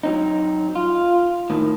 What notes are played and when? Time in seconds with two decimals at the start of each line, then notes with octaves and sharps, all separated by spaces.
0.03 F#3 C4 D#4
0.75 F4
1.50 A2 D#3